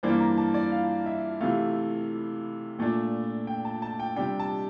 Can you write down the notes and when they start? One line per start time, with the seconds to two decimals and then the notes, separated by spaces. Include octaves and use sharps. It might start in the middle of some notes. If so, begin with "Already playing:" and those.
0.03 G2 E3 A#3 D4 C5
0.20 A#5
0.37 A5
0.54 D5
0.72 F5
1.06 E5
1.41 C3 E3 A3 F5
2.79 A#2 A3 D4
3.47 G5
3.65 A5
3.82 A5
4.00 G5
4.16 C3 G3 D4 G5
4.40 A5